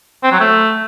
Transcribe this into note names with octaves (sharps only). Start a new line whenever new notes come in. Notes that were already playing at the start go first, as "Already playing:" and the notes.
C4
F#3
A3